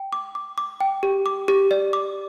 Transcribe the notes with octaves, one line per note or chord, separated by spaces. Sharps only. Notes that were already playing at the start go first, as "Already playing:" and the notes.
Already playing: G5
D6
D6
D6
G5
G4
D6
G4
D5
D6